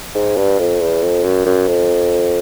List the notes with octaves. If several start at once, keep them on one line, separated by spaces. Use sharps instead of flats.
G#2
G2
F2
E2
F2
F#2
F#2
F2